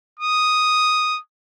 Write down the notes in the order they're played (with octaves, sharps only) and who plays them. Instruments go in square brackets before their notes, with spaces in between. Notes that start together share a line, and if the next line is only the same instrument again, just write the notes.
[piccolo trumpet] D#6